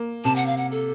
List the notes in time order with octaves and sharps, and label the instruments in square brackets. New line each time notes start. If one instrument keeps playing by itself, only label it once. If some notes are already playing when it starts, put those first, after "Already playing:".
Already playing: [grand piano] A#3
[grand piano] C3 [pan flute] A5
[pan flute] F#5
F5
F#5
A4